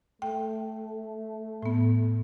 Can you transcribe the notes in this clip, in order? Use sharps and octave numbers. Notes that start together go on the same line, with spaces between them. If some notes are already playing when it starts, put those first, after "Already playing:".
A3 G5
A2 B3